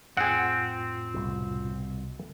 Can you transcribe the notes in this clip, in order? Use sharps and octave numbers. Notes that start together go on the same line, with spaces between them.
F2 A2 C4 F4 G#4 F#5
C2 B2